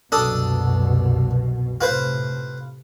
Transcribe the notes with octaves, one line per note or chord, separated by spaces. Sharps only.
C2 F#2 B2 D4 A4 D#6
A2 C3 F4 B4 C5